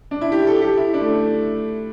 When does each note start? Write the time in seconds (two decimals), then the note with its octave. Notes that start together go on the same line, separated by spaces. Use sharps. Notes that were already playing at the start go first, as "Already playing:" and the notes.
0.11 D4
0.21 E4
0.32 G4
0.47 A4
0.62 G4
0.77 E4
0.94 D4
1.01 A3